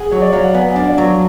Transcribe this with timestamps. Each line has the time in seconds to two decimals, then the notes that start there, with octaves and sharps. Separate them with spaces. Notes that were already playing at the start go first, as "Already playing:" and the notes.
Already playing: G#4 F#5
0.11 F#3 C#5
0.22 D5
0.33 F#3 F5
0.43 F#5
0.55 B3 G#5
0.69 F#5
0.76 D4 F5
0.83 D5
0.98 F#3